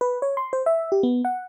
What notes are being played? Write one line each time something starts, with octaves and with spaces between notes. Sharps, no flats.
B4
C#5
C6
C5
E5
G4
B3
F#5